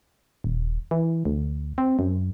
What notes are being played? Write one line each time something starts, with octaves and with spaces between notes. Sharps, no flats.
D#1
E3
D2
C4
F#2